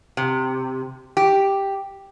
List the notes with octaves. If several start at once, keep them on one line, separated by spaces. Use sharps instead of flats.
C3
G4